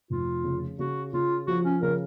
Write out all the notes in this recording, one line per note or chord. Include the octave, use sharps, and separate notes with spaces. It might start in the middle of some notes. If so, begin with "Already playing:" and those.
F1 F4
C#3
C#3 F#4
C#3 F4
F3 F#4
C#4
C#3 A#4